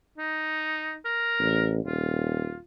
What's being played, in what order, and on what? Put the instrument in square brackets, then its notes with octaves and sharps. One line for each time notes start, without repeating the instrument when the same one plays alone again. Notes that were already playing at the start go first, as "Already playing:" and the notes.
[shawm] D#4
A#4
[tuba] A1
[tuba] D#1 [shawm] F4